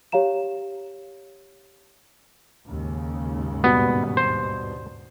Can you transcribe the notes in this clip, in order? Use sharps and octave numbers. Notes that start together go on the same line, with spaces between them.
G4 C#5 F5 A#5 E7
D#2 G#2 C#3
G2 B2 B3
C5